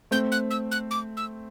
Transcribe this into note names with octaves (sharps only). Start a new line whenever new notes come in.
A3 C4 G6
F#6
E6
F#6
D6
E6